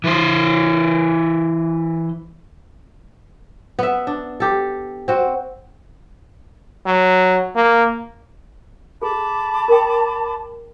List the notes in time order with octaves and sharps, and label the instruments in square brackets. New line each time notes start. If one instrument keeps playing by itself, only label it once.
[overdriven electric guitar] E3 C5
[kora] B3 E5
D4
G4 A4
C4 F#4
[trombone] F#3
A#3
[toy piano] G#4 A4 [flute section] A5 B5 D6
[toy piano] A#4 G5